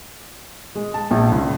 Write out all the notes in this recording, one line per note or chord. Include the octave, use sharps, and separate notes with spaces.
G#3
A5
A#1
C#2